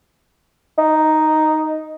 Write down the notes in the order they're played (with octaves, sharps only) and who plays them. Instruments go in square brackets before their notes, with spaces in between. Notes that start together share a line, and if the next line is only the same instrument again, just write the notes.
[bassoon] D#4